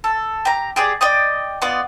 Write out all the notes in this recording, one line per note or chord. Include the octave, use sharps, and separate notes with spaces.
A4
G4 A#5
G4 G#4 D5
D5 D#5 G5 D#6
B3 F4 D5 D#5